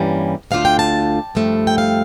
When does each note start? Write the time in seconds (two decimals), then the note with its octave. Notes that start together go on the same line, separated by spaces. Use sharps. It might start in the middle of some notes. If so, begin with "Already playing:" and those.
Already playing: G2 E3 G3 A#3 C#4
0.51 D2 D3 A3 D4 F4 F5
0.65 G5
0.79 A5
1.35 G2 F3 A3
1.67 G5
1.78 F5